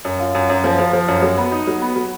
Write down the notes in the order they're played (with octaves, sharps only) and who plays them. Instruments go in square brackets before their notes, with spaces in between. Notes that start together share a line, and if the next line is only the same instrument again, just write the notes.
[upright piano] F#2
F4
F#2
F#2
F3
F3
F3
F#2
F#3
B3
D#4
F#3
B3
F#3